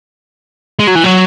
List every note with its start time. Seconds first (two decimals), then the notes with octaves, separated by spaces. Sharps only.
0.79 G#3
0.88 F#3
0.96 E3
1.04 F#3